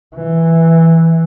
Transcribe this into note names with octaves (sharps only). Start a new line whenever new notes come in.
E3